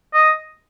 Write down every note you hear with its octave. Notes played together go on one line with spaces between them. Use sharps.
D#5